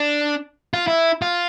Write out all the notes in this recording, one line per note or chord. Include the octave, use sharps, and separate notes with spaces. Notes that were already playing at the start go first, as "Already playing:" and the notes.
Already playing: D4
F4
E4
F4